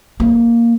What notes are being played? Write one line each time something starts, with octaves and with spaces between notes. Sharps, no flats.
A#3